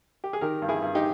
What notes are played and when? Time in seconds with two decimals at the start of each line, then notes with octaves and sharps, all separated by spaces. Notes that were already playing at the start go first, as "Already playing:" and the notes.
0.24 G4
0.33 G#4
0.41 D#3 G4 A#4
0.62 G2
0.68 E4 G#4
0.82 G2
0.95 D#4 G4